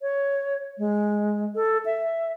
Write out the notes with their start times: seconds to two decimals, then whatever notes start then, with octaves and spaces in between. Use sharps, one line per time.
0.02 C#5
0.78 G#3
1.55 A4
1.86 E5